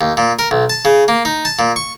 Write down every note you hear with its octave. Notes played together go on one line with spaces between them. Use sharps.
D#2
A#2
A#4
B1
A5
C#3
A#3
D#4
A5
A#2
C#6